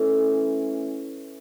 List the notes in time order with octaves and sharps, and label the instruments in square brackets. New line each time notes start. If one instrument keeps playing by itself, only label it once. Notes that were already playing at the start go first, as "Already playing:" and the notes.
Already playing: [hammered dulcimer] E3 A3 C#4